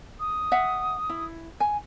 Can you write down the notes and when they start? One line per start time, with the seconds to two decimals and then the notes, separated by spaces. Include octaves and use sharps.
0.20 D#6
0.52 E5 F#5
1.09 E4
1.60 G#5